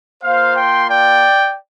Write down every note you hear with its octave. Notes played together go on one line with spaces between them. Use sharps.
A#3 F4 C5 F5
G5 C6
D5 G5